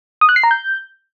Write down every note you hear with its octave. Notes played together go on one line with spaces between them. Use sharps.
D#6
F#6
C7
A#5
G6